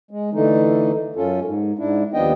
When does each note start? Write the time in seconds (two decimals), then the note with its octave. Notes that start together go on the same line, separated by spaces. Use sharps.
0.11 G#3
0.33 D3 E3 A3 D#4
1.16 F#2 C#4 F4 A4
1.44 G#2
1.79 G#2 D4 E4
2.14 D#2 F3 B3 D4 D#5 G5